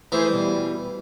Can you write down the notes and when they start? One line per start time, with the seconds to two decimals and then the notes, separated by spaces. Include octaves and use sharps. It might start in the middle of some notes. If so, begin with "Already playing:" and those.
0.12 E3 A3 G#4 C5
0.29 B2 G3